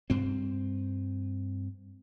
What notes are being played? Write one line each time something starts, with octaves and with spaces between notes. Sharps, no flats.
G2 C4